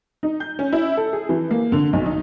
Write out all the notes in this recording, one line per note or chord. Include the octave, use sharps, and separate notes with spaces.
D#4
G6
C#4
E4
A4
G#4
E3
A#3
D3
B1
D#4